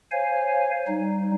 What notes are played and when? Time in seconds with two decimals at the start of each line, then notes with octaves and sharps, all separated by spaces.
0.11 C5 C#5 F5 G#5
0.87 G3 D#4